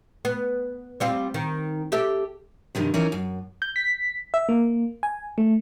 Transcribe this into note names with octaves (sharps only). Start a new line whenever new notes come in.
B3
G3 C4 F4
D#3
G4 A4 E5
G2 C3 D#3 F3
E3 F3 C#4 D#4 A#4
F#2
G6
B6
E5
A#3
G#5
A3